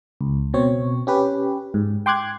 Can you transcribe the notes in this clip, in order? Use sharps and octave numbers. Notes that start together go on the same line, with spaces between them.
C#2
B2 C4 C#5
C#4 G4 B4
G#2
G5 C6 D6 F#6 G#6